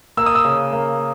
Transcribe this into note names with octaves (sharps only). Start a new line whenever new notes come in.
A#3 E6
D#6
E6
C#3
A#3